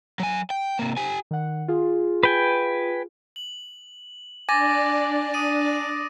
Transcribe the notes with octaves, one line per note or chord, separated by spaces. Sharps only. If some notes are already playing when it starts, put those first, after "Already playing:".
F#3 G#5
G5
C3 A#3
G4 G#5
D#3 F#5
F4 G#4
B4 G5 G#5
F#7
D4 D5 G#5 D6 A6 A#6
D#6 D#7